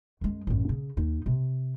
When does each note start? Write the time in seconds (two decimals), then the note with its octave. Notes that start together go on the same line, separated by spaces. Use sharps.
0.21 F#2 G#3
0.47 A1 F#2
0.69 C#3
0.97 D#2 D#4
1.26 C3